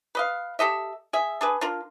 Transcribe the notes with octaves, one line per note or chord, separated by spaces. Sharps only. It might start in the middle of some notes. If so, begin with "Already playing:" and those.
B4 D#5 F5
G4 A4 D#5 E5
G#4 E5
D4 G#4 B4
D4 F4 A#4